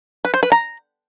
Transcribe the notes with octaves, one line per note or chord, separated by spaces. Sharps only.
B4
C5
B4
A#5